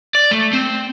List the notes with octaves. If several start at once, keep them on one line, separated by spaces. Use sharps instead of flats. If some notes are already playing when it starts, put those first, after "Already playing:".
D5
A3
C4